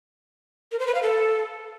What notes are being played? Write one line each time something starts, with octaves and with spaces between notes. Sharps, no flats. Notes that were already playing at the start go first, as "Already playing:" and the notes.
A#4
C5
B4
F5
A4